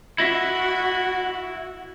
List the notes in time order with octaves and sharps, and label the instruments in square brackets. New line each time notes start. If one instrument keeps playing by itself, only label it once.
[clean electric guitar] E4 D#5 E5 [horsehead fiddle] F#4